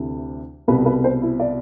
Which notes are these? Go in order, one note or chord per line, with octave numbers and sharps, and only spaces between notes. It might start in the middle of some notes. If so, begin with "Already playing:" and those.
Already playing: D2 C3 E3
C2 B2 B4
B4
C5
E4
D5